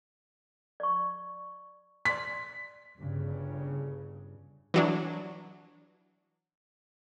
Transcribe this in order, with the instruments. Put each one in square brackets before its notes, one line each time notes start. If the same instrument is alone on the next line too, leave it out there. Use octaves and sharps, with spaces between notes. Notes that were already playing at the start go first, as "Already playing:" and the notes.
[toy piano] D5 C#6
[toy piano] D5 C6 [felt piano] B6
[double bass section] G1 G2 C#3
[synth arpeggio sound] E3 F#3 D4